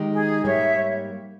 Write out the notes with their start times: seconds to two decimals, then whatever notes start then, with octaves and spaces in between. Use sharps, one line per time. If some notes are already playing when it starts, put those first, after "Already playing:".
Already playing: D#3 G#3 D#4 G4
0.12 G#4
0.45 G#2 G3 A#3 C#5 E5